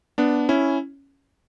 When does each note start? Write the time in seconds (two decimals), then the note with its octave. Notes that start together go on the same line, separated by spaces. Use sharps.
0.18 B3 D4
0.49 C#4 E4